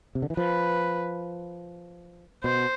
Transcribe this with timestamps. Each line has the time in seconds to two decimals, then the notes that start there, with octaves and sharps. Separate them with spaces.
0.15 C3
0.22 D3
0.30 E3
0.37 F3 B4
2.44 B2 C5